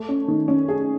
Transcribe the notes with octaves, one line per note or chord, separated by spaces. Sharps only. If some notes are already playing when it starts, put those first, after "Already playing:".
Already playing: A3
C#4
D#3
C#4
G#4